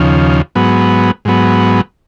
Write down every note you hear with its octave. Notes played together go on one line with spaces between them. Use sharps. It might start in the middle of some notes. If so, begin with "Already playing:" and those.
Already playing: D#2 C#3 F3
G#2 F#3 B3
G#2 F#3 B3